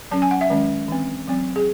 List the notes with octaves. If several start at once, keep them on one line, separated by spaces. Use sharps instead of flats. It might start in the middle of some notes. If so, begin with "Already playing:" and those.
F#3 C#4 A5
G#5
F#5
E5
D#3 G#3 C#4
E3 C4
F#3 C4
G#4